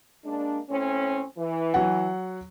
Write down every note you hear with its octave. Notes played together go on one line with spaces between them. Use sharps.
G#3 A#3 D4
A2 C4 C#4
E3
F#3 F#5